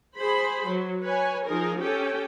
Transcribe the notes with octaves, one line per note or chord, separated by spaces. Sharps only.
G#4 C5 B5
F#3
B4 C#5 G#5
F3 D#4 G#4 A#4
C#4 G4 A4 G5